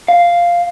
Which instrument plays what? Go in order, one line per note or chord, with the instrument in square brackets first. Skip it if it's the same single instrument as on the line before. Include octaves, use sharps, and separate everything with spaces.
[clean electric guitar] F5